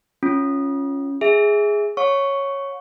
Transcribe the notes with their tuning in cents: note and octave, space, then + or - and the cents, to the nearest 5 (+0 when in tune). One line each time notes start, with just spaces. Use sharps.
C#4 +0 F4 +0
G#4 +0 E5 -15
C#5 -5 F#5 -40 C#6 +5